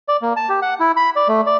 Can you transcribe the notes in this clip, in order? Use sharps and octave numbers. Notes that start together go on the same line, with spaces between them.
D5
A#3
A5
G4
F#5
E4
B5
D5
A3
D5